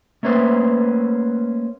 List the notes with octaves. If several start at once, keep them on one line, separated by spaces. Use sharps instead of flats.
A3 A#3 C#4 B4 C5